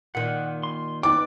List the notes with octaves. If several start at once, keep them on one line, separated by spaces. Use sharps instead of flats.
A#2 D#3 F#5
C6
D#4 B4 D5 G5 D6